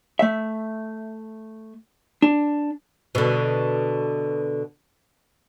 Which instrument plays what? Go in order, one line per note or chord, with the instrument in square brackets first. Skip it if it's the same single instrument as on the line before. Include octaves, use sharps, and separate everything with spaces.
[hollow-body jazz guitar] A3 E5
D4
[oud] B2 D3